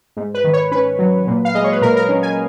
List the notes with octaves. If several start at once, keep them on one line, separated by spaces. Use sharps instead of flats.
G#2
B4
D#3
C#5
C#4 B4
F#3
A#2
F5
G#3 D#5
C#5
B4
A#2 A#4
A#4
C#4
G#5